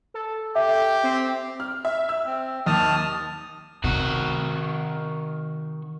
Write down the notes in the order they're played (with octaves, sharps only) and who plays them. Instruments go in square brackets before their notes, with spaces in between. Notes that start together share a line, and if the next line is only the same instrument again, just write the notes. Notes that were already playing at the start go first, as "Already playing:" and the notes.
[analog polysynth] A4
[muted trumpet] G4 [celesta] E5
[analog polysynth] C4
[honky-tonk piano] F6
E5
E6
[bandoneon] C4
[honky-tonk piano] D#2 [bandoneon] A5 D#6 F6
[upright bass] C3 [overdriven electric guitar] D#3 F#4